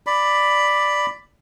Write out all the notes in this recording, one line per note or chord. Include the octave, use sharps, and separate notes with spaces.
D5 B5